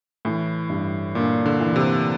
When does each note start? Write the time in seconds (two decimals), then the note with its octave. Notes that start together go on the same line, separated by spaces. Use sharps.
0.25 A2 E3
0.69 G2
1.15 A#2 D4
1.46 D3
1.60 E3
1.76 C3